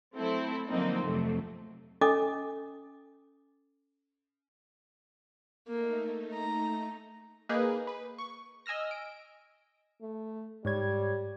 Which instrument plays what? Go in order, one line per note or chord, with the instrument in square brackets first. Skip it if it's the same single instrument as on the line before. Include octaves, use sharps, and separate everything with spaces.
[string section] F#3 A3 C4 E4 A4
D3 F3 F#3 A#3 C4 D#4
F2 C3 F#3 A3
[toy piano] C#4 A4 D#5 G#5 D6
[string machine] A3 D#4 [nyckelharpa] A#3
[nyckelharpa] A#5
[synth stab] A#3 D#4 G#4 B4
B4
C#6
D#5 G#5 E6 F6 A#6
D7
[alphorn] A3
[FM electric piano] G#2 C#5 G#6 [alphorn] G3